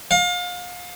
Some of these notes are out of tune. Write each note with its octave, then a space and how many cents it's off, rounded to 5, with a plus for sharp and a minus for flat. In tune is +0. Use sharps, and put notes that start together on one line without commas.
F5 +35